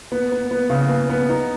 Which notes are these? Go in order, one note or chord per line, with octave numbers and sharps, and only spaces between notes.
B3
B3
B3
C#3
B3
B3
D#4